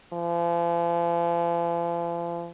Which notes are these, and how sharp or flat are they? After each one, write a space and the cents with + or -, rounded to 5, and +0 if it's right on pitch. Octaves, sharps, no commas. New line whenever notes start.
F3 -40